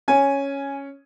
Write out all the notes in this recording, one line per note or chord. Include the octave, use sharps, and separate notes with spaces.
C#4 G#5